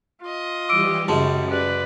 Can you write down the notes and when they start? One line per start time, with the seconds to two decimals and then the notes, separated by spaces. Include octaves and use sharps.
0.21 F4 D#5
0.69 E3 G3 G4 D6 E6 D7
1.08 F#2 C#3 G3 G#3 A5
1.49 B4 D5